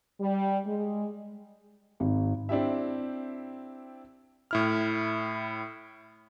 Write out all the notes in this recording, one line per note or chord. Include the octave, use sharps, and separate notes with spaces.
G3
G#3
G#1
C4 D4 E4 G4 E5
A2 E4 F6